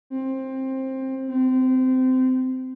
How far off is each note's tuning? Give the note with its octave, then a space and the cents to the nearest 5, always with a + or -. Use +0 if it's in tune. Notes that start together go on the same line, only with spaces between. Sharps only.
C4 +15
C4 -20